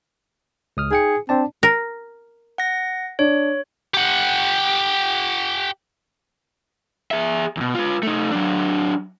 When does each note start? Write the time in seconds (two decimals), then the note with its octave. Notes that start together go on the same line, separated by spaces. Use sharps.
0.77 C#2 D#6 F6
0.91 D#4 G#4 G5 C#7
1.29 C4 D4 D5 A5
1.63 A#4
2.58 F#5 A#6
3.19 D4 C#5
3.94 G4 F#5
7.11 G#4 E5
7.57 E2 B2
7.75 F4 B4
8.03 A3 D#4
8.32 F#3 D4